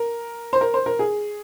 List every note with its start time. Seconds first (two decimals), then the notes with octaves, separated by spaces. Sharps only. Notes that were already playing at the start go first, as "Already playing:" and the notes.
Already playing: A#4
0.53 C5
0.61 A#4
0.74 C5
0.86 A#4
0.99 G#4